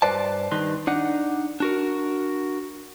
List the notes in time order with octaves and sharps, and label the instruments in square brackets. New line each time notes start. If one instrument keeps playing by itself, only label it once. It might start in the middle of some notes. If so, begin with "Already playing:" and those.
[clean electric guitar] G2 B4 C5 D5 A5
G2 D#3 D#4 B4 C6
D4 D#4 F#5
D4 F#4 A#4